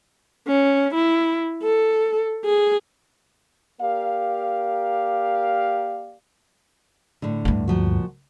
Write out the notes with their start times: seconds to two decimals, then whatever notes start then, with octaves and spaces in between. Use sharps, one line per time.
0.48 C#4
0.95 E4
1.63 A4
2.45 G#4
3.82 A#3 G4 A#4 D5 F5
7.22 A2 D3
7.45 D2 G2
7.68 A#2 F3 F#4